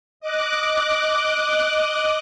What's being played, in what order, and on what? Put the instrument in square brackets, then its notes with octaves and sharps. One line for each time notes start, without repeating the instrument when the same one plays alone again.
[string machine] D#5 D6 F#6